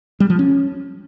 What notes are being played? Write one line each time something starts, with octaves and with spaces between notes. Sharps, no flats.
G3
F3
C#4